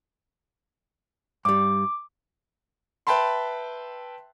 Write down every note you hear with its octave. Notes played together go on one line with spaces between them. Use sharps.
G2 G3 D6
B4 E5 G5 A5 B5 C6